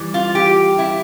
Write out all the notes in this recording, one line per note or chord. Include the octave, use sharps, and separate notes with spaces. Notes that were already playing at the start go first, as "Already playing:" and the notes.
Already playing: E3 G3
F4
G4
E4